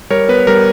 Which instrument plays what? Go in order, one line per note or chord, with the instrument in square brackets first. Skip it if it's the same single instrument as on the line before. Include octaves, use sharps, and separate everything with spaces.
[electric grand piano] G3 A#4 C#5
B3 B4
G3 A#4